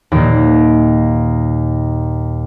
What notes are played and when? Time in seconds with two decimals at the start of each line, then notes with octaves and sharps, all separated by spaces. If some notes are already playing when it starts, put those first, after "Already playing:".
0.12 D#2 A#2